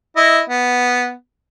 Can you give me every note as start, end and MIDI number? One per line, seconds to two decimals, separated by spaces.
0.16 0.41 64
0.16 0.41 75
0.49 1.12 59